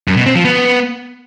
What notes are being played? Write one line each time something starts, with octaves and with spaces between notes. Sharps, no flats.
F#2
B2
C4
F3
B3